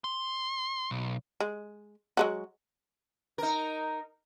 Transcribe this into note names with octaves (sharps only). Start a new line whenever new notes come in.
C6
B1
G#3
F#3 G#3 F#4
D#4 A#4